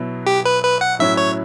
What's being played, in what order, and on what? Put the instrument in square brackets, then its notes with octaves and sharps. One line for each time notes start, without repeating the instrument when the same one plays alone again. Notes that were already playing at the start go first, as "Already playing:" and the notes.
Already playing: [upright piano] B2 F#3 B3 E4
[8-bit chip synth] G4
B4
B4
F#5
[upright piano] A2 F#3 C#4 E4 [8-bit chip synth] E5
[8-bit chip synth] C#5